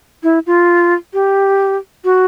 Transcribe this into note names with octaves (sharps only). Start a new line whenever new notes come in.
E4
F4
G4
F#4